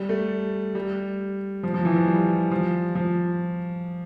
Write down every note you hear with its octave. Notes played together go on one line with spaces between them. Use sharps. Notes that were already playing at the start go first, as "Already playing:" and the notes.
Already playing: G3
A3
G3
F3
F3
E3
F3
G3
F3
F3